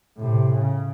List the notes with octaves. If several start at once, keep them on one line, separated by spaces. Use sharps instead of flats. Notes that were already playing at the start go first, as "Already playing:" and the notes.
A2 C3
C#3